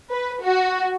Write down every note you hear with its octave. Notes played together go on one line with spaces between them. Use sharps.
B4
F#4